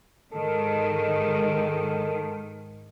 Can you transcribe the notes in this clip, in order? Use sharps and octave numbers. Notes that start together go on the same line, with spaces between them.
G#2 D#3 A4